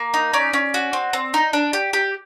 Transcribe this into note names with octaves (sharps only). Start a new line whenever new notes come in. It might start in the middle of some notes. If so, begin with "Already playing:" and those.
Already playing: A#3
D#4
C#4 D5
C#4
F#4
C4
C4
D#4
D4
G4
G4